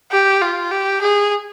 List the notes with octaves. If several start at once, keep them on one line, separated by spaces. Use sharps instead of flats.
G4
F4
G4
G#4